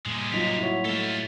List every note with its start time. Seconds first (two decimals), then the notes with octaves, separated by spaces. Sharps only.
0.06 A2 C3 G3 G#3 A#3
0.32 F#3 D#4 F4 B6 F7
0.58 E4 F#4 C#5
0.85 A3 A4 F5 G7